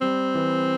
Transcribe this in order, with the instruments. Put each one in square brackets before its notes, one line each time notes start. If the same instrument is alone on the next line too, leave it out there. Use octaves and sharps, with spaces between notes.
[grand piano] G3 [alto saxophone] C4
[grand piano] E3